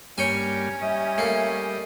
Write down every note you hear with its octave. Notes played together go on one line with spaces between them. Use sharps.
G2 G3 A#3 C#4 C#5 G5 G#5
G3 D#5 E5
A3 A#3